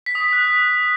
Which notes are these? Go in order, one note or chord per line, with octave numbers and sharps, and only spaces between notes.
B6
D#6
B6
F#6